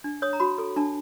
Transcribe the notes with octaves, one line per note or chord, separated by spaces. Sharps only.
D4
C#5 D#6
A#5
F#4 B5
A4
D4 A5